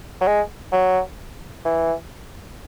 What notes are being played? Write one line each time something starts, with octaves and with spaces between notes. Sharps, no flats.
F#3
G#3
F#3
E3